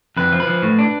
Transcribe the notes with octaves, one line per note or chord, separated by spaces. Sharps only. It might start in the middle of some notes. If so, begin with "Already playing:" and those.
F2 B4
F3
B4
F3
A2
D4